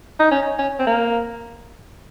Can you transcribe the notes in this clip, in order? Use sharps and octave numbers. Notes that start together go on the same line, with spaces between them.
D#4
C#4
C#4
C4
A#3